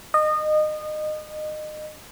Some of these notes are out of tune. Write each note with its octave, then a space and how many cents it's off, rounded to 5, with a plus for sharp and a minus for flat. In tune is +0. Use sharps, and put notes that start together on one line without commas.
D#5 -25